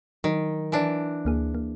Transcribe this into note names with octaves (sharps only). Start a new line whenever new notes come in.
D#3 F#3
E3 D4
D2 A#3 G#4
A#3